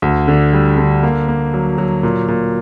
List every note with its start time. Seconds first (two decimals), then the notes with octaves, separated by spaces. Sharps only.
0.02 D2
0.28 D3
0.53 G3
0.78 D3
1.03 A#3
1.28 A#3
1.54 F#3
1.78 F#3
2.03 A#2
2.28 A#2